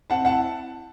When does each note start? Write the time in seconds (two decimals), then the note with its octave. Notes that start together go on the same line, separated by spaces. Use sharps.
0.10 C4 F#5 A5
0.25 E4 F#5 A5